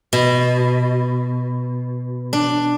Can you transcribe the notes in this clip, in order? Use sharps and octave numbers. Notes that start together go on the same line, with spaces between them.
B2
D4